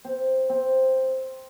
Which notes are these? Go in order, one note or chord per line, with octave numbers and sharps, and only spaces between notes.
C4
C4